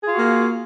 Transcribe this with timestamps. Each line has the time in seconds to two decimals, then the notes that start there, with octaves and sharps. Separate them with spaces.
0.03 G#4
0.08 F4
0.13 F#4
0.18 A#3